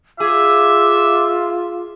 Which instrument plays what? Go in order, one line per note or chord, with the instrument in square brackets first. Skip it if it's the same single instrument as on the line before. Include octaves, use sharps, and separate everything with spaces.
[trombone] F4 [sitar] G#4 [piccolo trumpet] E5 [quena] D6